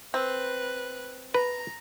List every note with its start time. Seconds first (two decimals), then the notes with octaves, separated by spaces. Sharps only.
0.14 C4 B4 F#6
1.34 B4 A#5